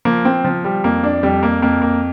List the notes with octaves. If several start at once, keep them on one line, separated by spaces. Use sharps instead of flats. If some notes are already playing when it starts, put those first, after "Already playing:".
F3 A#3
C4
F3
G3
F2 A#3
D4
F2 G3
A#3
F2 A#3
A#3